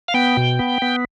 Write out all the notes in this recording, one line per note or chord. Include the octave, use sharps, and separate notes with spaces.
F5
B3 G5
B2
B3
B3